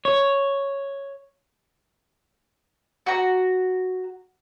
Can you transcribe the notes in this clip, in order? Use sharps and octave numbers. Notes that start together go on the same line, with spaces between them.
C#5
F#4 A#5